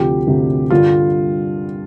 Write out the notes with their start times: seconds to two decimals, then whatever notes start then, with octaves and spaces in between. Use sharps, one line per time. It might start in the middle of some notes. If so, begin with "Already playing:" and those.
Already playing: D2 C3 F3 G4
0.27 D2 C3 F3
0.70 G2 D3 G3 F4